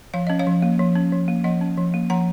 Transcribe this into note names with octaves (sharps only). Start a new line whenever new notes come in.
F3 F5
C#4 D#5
C#5 F5
F3
A#3
F3
C#4
F3
A#3
F3 D#5 F#5
C#4
F3
A#3
F3 F#5 A#5